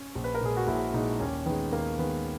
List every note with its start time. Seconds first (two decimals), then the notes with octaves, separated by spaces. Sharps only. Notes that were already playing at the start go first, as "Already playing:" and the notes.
Already playing: C#4
0.15 A#1
0.24 B4
0.35 A#4
0.41 A#2 G#3 G#4
0.57 F#4
0.68 A#1 E4
0.94 A#2 G#3 D#4
1.20 D#2 C#4
1.46 D#3 G#3 B3
1.72 D#2 A#3
1.98 D#3 G#3 B3